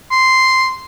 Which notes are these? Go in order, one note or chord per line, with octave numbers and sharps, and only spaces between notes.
C6